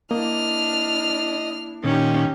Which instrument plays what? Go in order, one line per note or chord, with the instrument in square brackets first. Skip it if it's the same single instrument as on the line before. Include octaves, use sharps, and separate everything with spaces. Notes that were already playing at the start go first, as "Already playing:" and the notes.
[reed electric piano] A#3 [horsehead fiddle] D4 E4 [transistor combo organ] D#5 [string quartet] F6
[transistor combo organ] A#2 D#3 [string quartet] C#4 D#4 G4